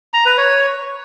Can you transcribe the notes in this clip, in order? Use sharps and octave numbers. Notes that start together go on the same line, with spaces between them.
A#5
B4
C#5